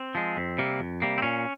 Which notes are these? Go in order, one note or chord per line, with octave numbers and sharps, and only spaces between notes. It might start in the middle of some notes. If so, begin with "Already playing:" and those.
Already playing: C4
F3 G#3
F2
C3 G3 A#3
F2
C3 G3 A#3
C4
A#2 C#4